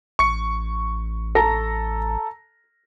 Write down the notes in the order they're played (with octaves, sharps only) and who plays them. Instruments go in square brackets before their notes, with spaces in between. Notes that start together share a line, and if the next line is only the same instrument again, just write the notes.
[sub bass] A1 [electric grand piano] C#6 C#7
[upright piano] A4 A#5 A#6